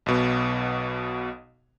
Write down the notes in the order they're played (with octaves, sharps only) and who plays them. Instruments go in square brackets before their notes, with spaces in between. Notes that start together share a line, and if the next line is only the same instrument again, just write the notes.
[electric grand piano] B1 B2 B3